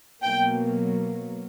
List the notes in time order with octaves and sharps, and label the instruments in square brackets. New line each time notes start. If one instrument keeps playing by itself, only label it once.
[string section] B2 F#3 A#3 G5